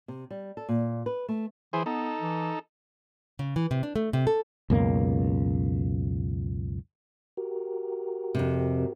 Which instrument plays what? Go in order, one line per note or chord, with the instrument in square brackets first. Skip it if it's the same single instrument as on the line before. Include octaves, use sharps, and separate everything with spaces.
[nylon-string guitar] C3
G3
A4
A#2
B4
A3
[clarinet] E3 [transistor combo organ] E4 G#4 C5
[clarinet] B3 [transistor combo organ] D#4 A4
[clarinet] E3
[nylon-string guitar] C#3
E3
C3
D4
A3
C3
A4
[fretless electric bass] C#2 F#2 B2 A#3
[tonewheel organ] F#4 G4 A#4
[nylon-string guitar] F2 C3